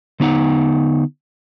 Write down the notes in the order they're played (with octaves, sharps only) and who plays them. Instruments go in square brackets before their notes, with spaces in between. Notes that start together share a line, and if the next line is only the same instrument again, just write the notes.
[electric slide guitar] D3 B3 D#4 F#5